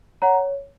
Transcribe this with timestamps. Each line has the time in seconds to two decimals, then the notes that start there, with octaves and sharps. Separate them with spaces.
0.22 C#5 F#5 A#5